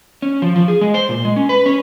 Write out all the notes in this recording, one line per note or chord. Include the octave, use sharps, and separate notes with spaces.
C#4
F3
F3
G#4
G#3
C5
A#2
G#3
C#4
B4
C#4